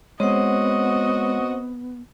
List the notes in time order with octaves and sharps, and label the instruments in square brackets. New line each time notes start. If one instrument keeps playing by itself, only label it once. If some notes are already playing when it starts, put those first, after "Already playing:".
[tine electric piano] G#3 C#5 [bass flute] B3 [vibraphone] C4 C5 F#5 [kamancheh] F#4 D#5